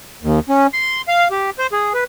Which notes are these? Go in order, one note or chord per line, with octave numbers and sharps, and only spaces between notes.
D#2
C#4
C6
F5
G4
C5
G#4
B4